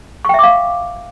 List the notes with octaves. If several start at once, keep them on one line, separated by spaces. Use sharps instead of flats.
E5 F5 G5 C#6 D6